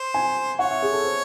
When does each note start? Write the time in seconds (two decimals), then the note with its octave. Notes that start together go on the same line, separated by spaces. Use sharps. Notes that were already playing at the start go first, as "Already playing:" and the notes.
Already playing: C5
0.14 G#5
0.59 C#5 F#5
0.70 E5
0.82 G#4
0.93 A4
1.04 C5